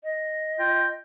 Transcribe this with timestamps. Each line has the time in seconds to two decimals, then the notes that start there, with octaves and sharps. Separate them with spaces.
0.03 D#5
0.59 F4 G5